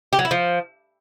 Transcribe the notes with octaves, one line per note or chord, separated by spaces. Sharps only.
G4
F#3
E4
F3